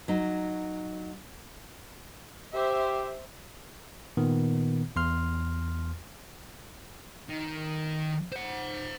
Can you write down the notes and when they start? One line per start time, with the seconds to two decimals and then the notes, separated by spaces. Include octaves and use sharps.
0.08 F#3 D#4
2.55 G4 C5 E5
4.17 A#2 D#3 B3
4.96 E2 C6 F6
7.29 D#3
8.32 C5 F#5